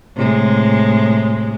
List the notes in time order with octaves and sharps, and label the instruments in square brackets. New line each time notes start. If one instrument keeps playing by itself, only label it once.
[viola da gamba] A2 C3 G#3